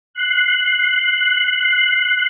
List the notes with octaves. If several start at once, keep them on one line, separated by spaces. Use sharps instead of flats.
F#6 C7